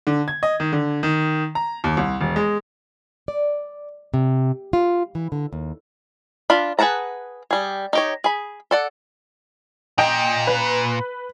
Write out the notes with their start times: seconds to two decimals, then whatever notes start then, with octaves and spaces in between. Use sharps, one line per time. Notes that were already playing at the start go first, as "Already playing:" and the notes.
0.07 D3
0.28 G#6
0.43 D#5
0.60 D#3
0.72 D3
1.03 D#3
1.55 A#5
1.84 D#2
1.97 C2
2.20 E1
2.36 G#3
3.28 D5
4.14 C3
4.73 F4
5.15 E3
5.32 D3
5.53 D#2
6.50 D4 F4 B5
6.79 G#4 B4 F#5 A5 A#5
7.51 G3 G#4
7.93 D#4 G4 C#5
8.24 G#4 B5
8.71 A4 D5 F#5
9.98 A#2 D#5 G5
10.47 B4